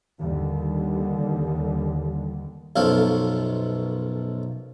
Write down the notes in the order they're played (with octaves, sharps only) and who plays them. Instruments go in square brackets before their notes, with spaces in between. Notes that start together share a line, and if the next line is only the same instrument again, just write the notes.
[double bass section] D#2 D3 G3
[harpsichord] B1 F#2 B2 F3 A4 F5